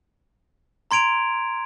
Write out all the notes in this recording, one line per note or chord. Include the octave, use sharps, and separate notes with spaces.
A#5 C6 G#6 D7 F7